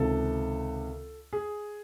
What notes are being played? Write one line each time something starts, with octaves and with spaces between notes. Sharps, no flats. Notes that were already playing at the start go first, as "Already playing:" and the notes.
Already playing: C#2 C3 D#3 A4
G#4